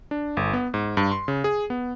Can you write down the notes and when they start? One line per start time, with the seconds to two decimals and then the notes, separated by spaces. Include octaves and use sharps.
0.11 D4
0.37 G1
0.53 B3
0.74 G#2
0.97 G2
1.11 C6
1.28 C#3
1.44 G#4
1.70 B3